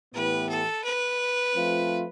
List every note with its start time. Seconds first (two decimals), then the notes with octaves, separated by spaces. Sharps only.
0.14 A2 E3 B3 E4 G4 B4
0.49 A4
0.84 B4
1.55 F3 A3 C4 F4